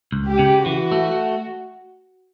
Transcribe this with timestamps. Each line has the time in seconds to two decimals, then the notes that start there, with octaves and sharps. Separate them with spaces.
0.12 C#2
0.26 G4
0.39 C#3
0.65 E3 F#4
0.92 A3